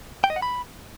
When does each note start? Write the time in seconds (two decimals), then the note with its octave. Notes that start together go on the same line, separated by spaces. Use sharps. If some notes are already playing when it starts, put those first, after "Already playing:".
0.24 G5
0.30 D#5
0.36 F#5
0.42 B5